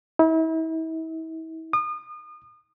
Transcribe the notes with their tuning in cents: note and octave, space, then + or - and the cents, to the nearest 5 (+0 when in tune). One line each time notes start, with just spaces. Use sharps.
E4 -40
D#6 -35